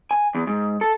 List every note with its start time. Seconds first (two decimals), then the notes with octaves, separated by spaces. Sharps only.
0.11 G#5
0.35 E2
0.47 G#2
0.81 A4